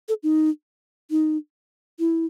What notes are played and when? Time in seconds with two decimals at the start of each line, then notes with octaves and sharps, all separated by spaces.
0.09 A4
0.23 D#4
1.11 D#4
1.99 E4